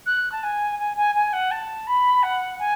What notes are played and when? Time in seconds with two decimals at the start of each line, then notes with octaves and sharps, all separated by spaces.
0.06 F#6
0.31 A5
0.43 G#5
0.79 G#5
0.97 G#5
1.15 G#5
1.33 F#5
1.51 A5
1.87 B5
2.22 F#5
2.59 G#5